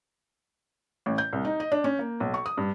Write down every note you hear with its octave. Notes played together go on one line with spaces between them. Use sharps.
A1
G6
C2
D#4
D#5
D4
C#4
A#3
B1
C#6
D#6
G2